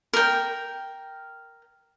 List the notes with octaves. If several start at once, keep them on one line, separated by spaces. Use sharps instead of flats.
A#4 G5